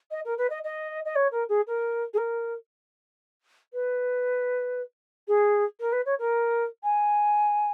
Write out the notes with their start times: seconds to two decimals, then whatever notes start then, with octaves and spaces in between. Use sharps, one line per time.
0.11 D#5
0.25 A#4
0.38 B4
0.50 D#5
0.64 D#5
1.05 D#5
1.15 C#5
1.31 A#4
1.49 G#4
1.67 A#4
2.13 G#4
2.17 A#4
3.73 B4
5.28 G#4
5.80 A#4
5.92 B4
6.05 C#5
6.19 A#4
6.83 G#5